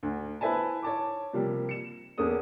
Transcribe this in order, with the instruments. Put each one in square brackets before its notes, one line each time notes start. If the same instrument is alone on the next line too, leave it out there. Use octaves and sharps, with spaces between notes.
[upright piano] D2
E4 B4 C5 E5 G#5 A5
C#5 A5 D6
C3 F3 G3 A#3
C#7 E7
E2 A#3 C#4 A4 D#6